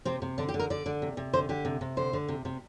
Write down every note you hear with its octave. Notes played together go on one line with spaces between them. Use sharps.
C3 C4
C3
D3 D4
G4
D3
A#4
D3 D5
D3
C3
C3
D3 C5
D3 G4
C3
C3
D3 C5
D3
C3
C3